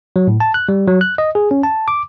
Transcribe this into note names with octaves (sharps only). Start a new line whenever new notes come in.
F#3
A2
A5
F#6
G3
F#3
F#6
D#5
G#4
C#4
A5
D6